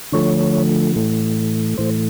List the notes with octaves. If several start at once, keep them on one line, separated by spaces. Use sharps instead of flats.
D3 F3 A3 C#5
A2 E3 A3
A2 E3 A3 C5